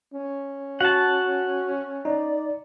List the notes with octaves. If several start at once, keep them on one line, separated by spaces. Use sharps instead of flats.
C#4
F#4 F#5 A5
D#4 D5